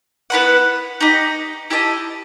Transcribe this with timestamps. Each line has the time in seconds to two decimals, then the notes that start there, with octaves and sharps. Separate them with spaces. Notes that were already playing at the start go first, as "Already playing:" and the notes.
0.30 B3 E4 B4 F#5
1.00 D#4 G4 D#5
1.70 E4 G4 D#5 A5